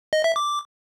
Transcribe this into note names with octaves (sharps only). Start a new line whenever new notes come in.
D#5
E5
D6